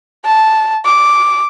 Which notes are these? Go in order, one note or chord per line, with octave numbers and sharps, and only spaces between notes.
A5
D6